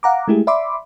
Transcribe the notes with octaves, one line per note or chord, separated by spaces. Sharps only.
F5 F#5 A#5 D6
G#3 A3 E4 G4 G#4
D5 E5 B5 C6 D6